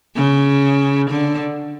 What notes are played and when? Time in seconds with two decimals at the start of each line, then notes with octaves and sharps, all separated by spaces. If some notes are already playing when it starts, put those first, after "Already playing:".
0.16 C#3
1.10 D3